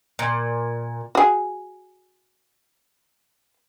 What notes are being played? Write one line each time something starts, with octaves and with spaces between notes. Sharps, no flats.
A#2
F#4 G#4